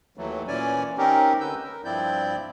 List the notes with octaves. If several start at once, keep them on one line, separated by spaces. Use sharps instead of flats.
D#2 E3 F#3 A3
A#2 E3 C#4 D5 G#5
C4 C#4 D#4 G4 A#4
D3 B4 E6 G6
A#4
G2 F3 C4 E4 D5 G6